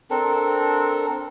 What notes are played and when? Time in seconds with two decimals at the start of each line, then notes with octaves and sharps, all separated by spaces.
0.11 C4 D4 A4 A#4